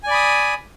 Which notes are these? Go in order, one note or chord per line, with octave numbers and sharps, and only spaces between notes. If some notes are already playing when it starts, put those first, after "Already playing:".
D5 G#5 B5 D#6